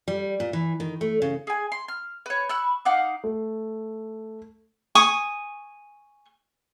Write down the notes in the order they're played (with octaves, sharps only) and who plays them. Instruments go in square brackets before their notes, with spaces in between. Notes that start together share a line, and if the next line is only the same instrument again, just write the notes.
[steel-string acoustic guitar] G3
A#2
E3
D#3
A3
C#3
[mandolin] G#4 G#5
C6
F6
B4 C#5
B5 C#6 E6 F#6
D#4 F5 F#5 D6
[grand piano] A3
[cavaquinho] G#5 C#6 D#6